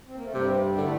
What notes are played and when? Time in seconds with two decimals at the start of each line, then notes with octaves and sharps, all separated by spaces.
0.07 C4
0.15 A#3
0.24 A3
0.33 G2 C3 G3
0.78 A2 D3 A3